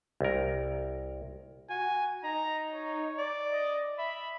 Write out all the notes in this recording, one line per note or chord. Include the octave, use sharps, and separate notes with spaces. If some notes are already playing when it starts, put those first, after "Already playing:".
C2 A#4
F#4 G#5
D#4 A#5
C#5
D5
D#5
E5 B5